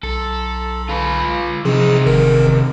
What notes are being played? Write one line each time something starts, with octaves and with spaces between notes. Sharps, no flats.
B1 A4
F4 B4
C3 F3 D#4 G#4
G1 D#3 A#4